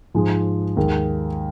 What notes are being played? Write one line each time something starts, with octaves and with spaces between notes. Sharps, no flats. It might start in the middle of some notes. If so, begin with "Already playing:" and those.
G#2 F3 G#3
D#2 D#3 G#3